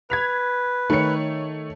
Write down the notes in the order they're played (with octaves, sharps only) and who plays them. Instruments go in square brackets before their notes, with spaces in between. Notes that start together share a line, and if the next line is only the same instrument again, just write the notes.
[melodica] B4 [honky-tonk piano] G#6 B6 F7
[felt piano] D#3 C#7 [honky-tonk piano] A3 C#5